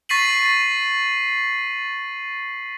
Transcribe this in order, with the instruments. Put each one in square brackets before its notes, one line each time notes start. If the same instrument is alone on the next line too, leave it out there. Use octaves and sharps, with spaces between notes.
[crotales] C#6 A6 B6 C7 D#7 F#7